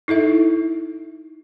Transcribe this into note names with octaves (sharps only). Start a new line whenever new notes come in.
D#4 E4 A4 E5